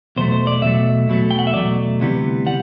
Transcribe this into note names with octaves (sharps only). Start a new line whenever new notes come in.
E2 B2 F#3 A3 C5
C5
D5
E2 B2 F#3 A3 E5
E2 B2 F#3 A3
G5
F#5
E5
E2 B2 F#3 A3 D5
D2 C3 E3 G3 B3
G3 B3 F#5